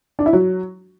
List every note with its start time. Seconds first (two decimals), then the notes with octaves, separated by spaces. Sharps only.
0.19 D4
0.26 E4
0.33 F#3